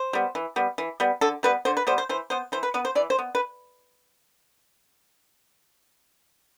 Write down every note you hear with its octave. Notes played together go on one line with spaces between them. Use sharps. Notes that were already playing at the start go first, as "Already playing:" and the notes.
Already playing: C5
G3 B3
E3
G3 B3
E3
G3 B3
D3 A4
G3 B3 B4
D3 C5
B4
G3 B3 C5
C5
E3 C5
B3 C5
E3 C5
B4
B3 B4
C5
E3 D5
C5
B3
B4